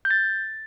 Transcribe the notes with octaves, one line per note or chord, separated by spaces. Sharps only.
G6
A6